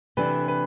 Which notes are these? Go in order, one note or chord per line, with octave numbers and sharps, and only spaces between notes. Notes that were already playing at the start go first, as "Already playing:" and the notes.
C3 E3 A3 D4 B4
B4